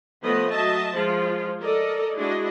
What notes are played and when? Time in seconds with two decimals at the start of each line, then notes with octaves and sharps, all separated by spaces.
0.22 F3 A3 B3 B4 D#5
0.51 F#3 D#5 E5 A5
0.94 F3 G#3 F4
1.60 A4 A#4 D5 D#5
2.16 G#3 D4 E4 F#4 D#5